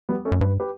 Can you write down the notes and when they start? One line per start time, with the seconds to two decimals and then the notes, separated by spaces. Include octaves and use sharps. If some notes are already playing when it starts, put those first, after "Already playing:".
0.09 G3 B3
0.25 A3 C#4
0.32 F#2
0.41 G2 B4
0.60 G4 B4